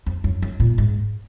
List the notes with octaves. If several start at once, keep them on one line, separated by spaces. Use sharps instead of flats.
F2
F#2
F#2
A#2
G#2